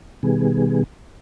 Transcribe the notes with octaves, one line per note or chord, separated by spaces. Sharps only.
B2 D#3 G3 B3 G#4